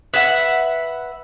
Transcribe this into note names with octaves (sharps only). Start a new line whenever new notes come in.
B4 E5 F#5